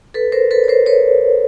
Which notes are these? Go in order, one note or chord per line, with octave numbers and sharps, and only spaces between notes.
A4 B4
A#4 C5
A4 B4
C#5
A#4 C5
B4 C#5